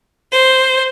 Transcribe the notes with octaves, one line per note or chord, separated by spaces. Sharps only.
C5